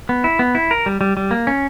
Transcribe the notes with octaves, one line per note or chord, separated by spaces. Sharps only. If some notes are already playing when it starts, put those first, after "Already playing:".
B3
E4
B3
E4
A#4
G3
G3
G3
A#3
C#4